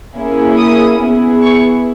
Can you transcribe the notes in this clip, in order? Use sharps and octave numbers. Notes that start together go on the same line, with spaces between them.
A#3 C#4 E4 G#4
D#6
B3 E4 G#4
C#6